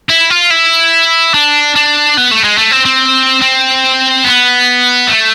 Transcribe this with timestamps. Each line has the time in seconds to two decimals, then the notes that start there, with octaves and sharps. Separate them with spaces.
0.09 E4
0.30 F4
0.50 E4
1.34 D4
1.76 D4
2.17 B3
2.31 A3
2.44 G#3
2.58 A3
2.71 C4
2.85 C4
3.42 C4
4.25 B3
5.07 A3